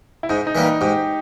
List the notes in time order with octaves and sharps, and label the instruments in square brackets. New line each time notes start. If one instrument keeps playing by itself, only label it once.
[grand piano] E4
[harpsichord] G#2 [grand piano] D#4
[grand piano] D#4
[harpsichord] E3 G3 A#3
[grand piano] D#4
[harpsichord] G#2 [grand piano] G4